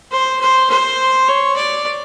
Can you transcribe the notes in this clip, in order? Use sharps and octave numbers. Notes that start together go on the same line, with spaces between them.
C5
C5
C5
C#5
D5